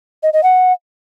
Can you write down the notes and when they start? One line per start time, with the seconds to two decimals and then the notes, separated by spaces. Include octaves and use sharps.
0.23 D#5
0.33 D#5
0.43 F#5